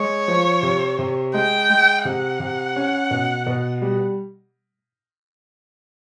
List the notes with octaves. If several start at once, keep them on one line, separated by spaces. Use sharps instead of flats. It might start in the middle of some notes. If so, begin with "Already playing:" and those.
Already playing: G#3 C#5
F3
C3
C3
G#3 G5
G#3
C3 F#5
C3
C#4
B2
B2
G3